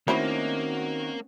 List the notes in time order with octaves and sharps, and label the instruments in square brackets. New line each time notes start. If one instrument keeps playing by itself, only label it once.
[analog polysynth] D#3 F#4 [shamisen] A3 E4 C5 [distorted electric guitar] A#3 [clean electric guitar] C4 C#4